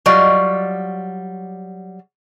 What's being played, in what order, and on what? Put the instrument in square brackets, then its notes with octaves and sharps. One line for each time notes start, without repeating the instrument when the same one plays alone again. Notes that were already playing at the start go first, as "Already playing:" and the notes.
[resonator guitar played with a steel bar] F#3 G3 F4 D5 D#5